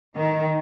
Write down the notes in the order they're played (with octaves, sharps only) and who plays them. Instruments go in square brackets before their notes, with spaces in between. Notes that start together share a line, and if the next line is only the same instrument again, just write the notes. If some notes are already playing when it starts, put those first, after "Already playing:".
[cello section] D#3